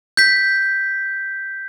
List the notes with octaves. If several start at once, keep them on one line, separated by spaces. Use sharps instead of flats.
G6 B6